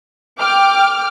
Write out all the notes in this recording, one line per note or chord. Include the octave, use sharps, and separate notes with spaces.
G5 D6 F6